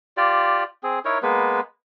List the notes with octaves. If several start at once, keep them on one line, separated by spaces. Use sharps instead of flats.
F4 G4 D5
C4 G#4
D#4 E4 A#4 C#5
G#3 A#3 B3 B4